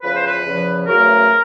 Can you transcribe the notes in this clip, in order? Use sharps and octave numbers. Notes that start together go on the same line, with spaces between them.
E2 C#3 F3 B4
C5
B4
E2 C#3 F3
E2 C#3 F#3 A3 A#4